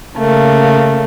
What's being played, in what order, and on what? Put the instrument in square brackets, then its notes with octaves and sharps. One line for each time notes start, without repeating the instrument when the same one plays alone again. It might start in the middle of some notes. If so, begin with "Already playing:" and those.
[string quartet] C#3 A3 A#3